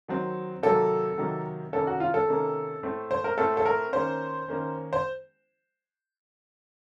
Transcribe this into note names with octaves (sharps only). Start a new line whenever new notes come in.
D#3 F#3 C4
C3 D#3 F#3 A#3 A4
C3 D#3 F#3 A#3
C3 D#3 A#3 C#4 A4
F#4
F4
A4
C3 D#3 A#3 C#4
A2 A3 C4
C5
A#4
A2 A3 C4 A4
A4
A#4
D#3 A#3 C#4 C5
D#3 A#3 C#4
C5